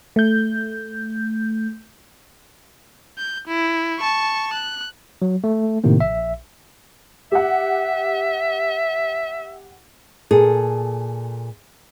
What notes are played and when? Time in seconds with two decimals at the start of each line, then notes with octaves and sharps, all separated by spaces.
0.16 A3 G6
3.18 G6
3.47 E4
3.99 A5 C#6
4.53 F#6
5.22 F#3
5.44 A3
5.84 A2 C3 D#3 A#3
5.99 A#1 E5
7.32 G4 E5 F#5
10.31 A#2 G#4 A4